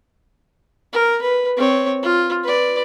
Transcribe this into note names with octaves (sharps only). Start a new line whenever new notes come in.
A#4
B4
C4 C#5
F4
B4 D5